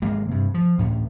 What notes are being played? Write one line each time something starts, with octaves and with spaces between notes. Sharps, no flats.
G#1 G#3 A#3
G2 C3
F3
D2 A2 C#4